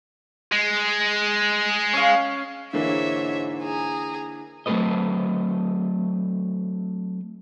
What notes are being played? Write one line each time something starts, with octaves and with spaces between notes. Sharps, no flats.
G#3
C#4 F5
G#2 D3 E3 A#3 C#5 E5
G#4 A#5
F#3 A3 C4 A4 B4 D#5